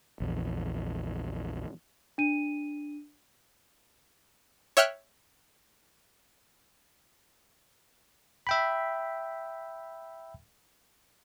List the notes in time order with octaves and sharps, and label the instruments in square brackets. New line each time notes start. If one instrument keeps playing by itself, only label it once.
[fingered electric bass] A#1 E2
[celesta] D4 D#7
[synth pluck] C#5 E5 G5 F6 F#6
[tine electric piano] E5 G5 B5